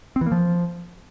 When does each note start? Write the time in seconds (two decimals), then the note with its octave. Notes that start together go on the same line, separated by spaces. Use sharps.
0.16 C4
0.21 E3
0.26 A#3
0.32 F3